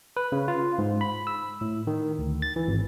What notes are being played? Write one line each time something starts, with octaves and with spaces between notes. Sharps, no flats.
B4
C#3
F4
G#2
B5
E6
A2
D#3
D2
A6
E3
G#1